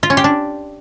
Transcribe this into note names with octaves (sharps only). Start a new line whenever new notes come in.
F4
C#4
G4
D4